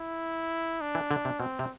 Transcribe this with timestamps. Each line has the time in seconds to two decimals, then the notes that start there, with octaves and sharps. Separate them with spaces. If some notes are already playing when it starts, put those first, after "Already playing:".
Already playing: E4
0.81 D4
0.95 E3
1.11 D3
1.25 C3
1.40 B2 C4
1.59 C3